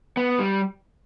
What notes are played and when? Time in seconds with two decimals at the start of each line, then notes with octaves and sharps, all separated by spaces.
0.17 B3
0.39 G3